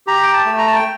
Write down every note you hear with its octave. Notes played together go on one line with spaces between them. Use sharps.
G4 A#5
G5
A5
A3
A#5
A5
G5